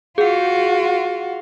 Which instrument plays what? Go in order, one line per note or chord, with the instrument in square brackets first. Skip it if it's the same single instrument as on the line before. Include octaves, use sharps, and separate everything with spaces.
[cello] F4 F#4 [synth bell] G#4 F#5